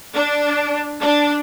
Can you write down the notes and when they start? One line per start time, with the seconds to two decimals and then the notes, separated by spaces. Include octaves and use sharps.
0.15 D4
1.00 D4